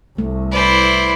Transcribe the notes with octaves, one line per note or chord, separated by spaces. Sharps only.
C2 A3
E4 B4 C5 D5